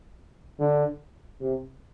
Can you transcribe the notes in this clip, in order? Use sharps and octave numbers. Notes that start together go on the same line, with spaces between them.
D3
C3